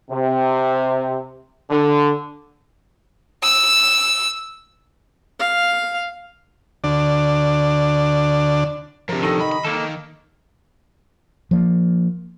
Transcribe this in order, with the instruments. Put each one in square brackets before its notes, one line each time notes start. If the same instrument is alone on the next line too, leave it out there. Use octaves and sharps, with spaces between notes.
[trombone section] C3
D3
[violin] E6
[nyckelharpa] F5
[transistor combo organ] D2 D3 D5
[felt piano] C3 A#4 [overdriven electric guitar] F3 D4
[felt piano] C3 A4 A#6 [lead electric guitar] D#3
[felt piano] D#5 [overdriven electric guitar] B5
[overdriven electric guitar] B5
[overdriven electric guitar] D#3 [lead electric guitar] A#3 A4
[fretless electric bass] F3 A#3